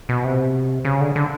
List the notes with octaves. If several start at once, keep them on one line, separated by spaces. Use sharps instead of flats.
B2
C3
C#3
D3
D3